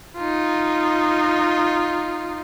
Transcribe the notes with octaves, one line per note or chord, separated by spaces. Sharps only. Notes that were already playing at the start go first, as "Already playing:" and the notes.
D#4 F4